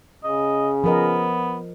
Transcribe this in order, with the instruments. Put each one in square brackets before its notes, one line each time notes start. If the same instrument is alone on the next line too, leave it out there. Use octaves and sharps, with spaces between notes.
[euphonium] C#3 [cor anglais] D#5
[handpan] F3 A#4 D#5 [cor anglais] B3